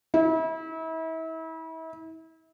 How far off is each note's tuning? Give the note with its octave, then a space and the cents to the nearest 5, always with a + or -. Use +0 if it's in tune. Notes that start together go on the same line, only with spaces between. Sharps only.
E4 -35